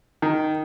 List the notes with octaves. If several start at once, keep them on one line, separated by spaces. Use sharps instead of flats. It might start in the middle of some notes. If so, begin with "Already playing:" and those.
D#3